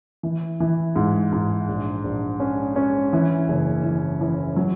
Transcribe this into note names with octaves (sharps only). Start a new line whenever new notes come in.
E3
E3
G#2
G#2
A#1
A#1
C#4
C#4
E3
F#1
E3
E3
F#3